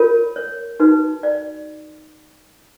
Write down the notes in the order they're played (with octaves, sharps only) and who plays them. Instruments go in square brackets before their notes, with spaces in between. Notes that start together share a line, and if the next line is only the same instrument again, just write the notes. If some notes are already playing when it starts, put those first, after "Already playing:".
Already playing: [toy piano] F4 A#4 C#5
C#5
D#4 F#4 B4
D5